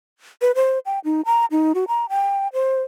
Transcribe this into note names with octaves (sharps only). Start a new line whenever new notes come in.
B4
C5
G5
D#4
A#5
D#4
F#4
A#5
G5
C5